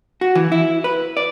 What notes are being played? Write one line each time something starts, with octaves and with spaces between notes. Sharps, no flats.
F#4
E3
E4
B4
D5